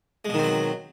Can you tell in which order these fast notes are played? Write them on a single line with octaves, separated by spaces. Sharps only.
G#3 B2 D#3 C4 F#3